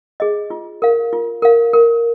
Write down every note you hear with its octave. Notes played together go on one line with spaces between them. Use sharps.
G#4 D#5
F4
A#4 F5
F4
A#4 F5
A#4